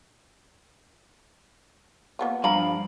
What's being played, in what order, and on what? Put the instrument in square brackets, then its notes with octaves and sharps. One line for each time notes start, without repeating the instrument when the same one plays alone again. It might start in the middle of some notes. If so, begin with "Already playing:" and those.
[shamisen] A#3 B3 F4
[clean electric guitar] G2 F3 B5 [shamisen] F5 A#5